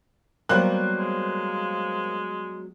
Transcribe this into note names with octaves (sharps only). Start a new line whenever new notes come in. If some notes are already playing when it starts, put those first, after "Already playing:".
F#3 G3 A#3 B3 C5 F#6
G#3